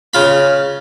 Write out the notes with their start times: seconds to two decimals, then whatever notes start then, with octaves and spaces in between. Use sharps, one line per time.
0.14 C#3 F4 B5